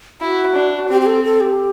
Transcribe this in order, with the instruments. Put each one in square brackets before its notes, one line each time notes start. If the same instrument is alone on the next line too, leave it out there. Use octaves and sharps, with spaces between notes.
[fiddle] E4 [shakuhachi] F#4
[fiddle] D4
[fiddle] C4 [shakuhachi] G4
[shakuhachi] G4
A4
A4
G4